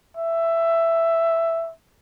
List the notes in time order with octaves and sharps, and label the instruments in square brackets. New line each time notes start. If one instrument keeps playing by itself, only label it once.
[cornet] E5